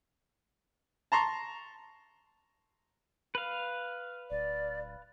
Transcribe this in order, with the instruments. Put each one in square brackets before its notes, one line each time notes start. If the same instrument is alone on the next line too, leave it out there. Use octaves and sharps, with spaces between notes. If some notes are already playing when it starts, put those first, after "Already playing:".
[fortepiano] A5 A#5 C6 C#6
[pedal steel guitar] B4 F5
[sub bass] D1 [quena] D5